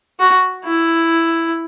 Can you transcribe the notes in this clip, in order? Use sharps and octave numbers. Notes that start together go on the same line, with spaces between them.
F#4
E4